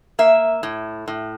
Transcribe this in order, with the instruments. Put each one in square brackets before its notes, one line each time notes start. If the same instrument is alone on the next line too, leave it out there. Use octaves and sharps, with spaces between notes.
[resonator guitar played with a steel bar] A#3 E5
A2
A2